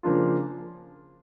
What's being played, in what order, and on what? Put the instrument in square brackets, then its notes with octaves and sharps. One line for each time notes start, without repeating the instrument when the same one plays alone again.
[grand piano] C#3 F3 A#3 D4 F4